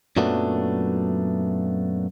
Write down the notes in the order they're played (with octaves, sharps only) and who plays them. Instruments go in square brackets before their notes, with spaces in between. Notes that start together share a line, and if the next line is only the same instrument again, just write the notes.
[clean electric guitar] F#2 A#2 F#3 A3 B3 D4